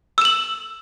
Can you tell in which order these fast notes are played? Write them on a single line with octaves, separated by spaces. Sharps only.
E6 E7 F#7